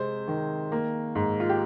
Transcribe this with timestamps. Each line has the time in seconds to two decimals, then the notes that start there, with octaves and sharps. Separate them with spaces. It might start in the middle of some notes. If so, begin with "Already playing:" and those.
Already playing: C3 G#3 C5
0.28 D#3
0.72 A#3
1.15 G#2
1.40 F4
1.49 G4